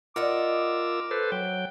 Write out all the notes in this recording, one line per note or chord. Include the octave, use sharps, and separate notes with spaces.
F4 A#4 D5 D#5 F#5 D6 E6
A4 B4 C5
F#3 G5